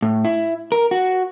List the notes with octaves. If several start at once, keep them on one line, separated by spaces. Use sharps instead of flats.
A2
E4
A#4
F#4